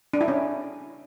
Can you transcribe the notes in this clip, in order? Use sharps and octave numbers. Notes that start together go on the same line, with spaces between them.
D4
E4
C#4